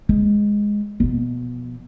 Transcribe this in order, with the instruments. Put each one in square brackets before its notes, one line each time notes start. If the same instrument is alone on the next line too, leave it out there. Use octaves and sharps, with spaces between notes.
[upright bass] G#3
B2 F3